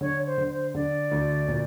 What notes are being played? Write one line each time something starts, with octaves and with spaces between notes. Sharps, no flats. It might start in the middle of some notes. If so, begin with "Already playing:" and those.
D3 C#5
C5
D3
C5
D3 D5
D2
A#2